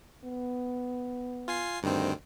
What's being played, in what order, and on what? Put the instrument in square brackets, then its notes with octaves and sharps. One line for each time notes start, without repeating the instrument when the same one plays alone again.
[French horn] B3
[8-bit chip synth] F4 G#5 C7
[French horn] D2 [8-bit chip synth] G2 D#3 C4